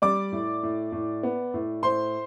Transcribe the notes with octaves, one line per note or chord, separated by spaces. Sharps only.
G3 D5 D6
A2
A2
A2
B3
A2
A2 C5 C6